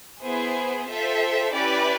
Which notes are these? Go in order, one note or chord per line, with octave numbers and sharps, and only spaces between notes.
B3 E4 G#4 C5
F4 A4 C5 E5 G5
C#4 E4 G4 B4 D5